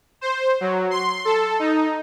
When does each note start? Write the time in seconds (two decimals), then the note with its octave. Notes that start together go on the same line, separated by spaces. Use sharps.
0.21 C5
0.61 F#3
0.91 C6
1.25 A4
1.59 D#4